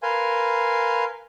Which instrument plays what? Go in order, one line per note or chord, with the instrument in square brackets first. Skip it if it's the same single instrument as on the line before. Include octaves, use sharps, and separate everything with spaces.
[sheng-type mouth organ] A#4 B4 F5 G#5 C6